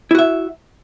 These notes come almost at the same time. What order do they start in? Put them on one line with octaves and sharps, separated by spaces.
E4 F#4 E5